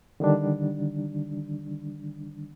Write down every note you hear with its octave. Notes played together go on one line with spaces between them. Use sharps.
D3 D#3 G3 D4